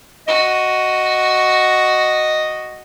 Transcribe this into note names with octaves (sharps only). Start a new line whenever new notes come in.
F#4 D#5